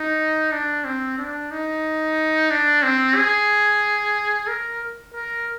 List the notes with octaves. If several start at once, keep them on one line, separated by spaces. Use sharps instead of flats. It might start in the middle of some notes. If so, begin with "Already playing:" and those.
Already playing: D#4
D4
C4
D4
D#4
D4
C4
G#4
A#4
A#4